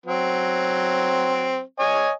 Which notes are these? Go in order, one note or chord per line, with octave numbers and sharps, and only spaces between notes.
F#3 C4
C#5 D#5 G#5